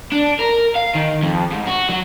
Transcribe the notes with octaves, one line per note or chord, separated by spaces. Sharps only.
D4
A#4
F5
D#3
F2
G#2
F#4
F#3